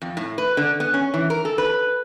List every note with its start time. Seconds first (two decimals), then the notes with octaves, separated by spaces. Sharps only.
0.02 F2
0.17 A2
0.38 B4
0.57 D3
0.80 B3
0.94 C#4
1.14 E3
1.30 A#4
1.45 A4
1.58 B4